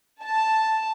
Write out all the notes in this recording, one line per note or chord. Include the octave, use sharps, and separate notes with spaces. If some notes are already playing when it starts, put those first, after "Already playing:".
A5